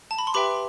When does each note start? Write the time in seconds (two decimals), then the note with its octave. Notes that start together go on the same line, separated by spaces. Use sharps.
0.11 A5
0.18 B5
0.27 C6
0.34 G4 B4 E5 G5 B5 D6